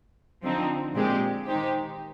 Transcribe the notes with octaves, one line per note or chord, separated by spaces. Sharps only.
D3 F3 C4 D#4
A#2 G#3 C4 G4
D#3 G#3 D#4 G4 C5